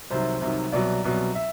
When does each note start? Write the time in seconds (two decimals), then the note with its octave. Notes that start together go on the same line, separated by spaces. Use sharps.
0.10 C2 C3 D#3 F#3 C5
0.41 C2 C3 D#3 F#3
0.72 C2 B2 F#3 D5
1.04 C2 B2 F#3
1.35 E5